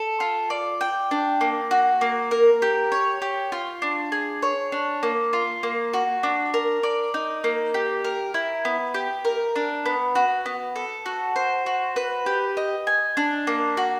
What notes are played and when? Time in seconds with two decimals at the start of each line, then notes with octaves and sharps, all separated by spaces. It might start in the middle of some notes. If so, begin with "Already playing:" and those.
Already playing: A4
0.20 F4
0.50 D5
0.81 G5
1.11 D4
1.41 A#3
1.71 F#4
2.01 A#3
2.31 A#4
2.62 G4
2.92 C#5
3.22 G4
3.52 F4
3.82 D4
4.12 G#4
4.42 C#5
4.72 D4
5.03 A#3
5.33 F4
5.63 A#3
5.93 F#4
6.23 D4
6.54 A#4
6.83 D5
7.14 D#4
7.44 A#3
7.74 G4
8.04 A#4
8.34 E4
8.65 B3
8.94 G4
9.25 A#4
9.56 D4
9.86 B3
10.15 F#4
10.46 B3
10.76 A4
11.06 F#4
11.36 C5
11.66 F#4
11.96 B4
12.26 G4
12.57 D#5
12.87 G#5
13.17 D4
13.47 A#3
13.77 F#4